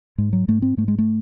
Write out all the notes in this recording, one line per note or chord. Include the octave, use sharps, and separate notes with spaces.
G#2 G#3
F#3
G#2 A3
C4
G#2 A3
G#3
A3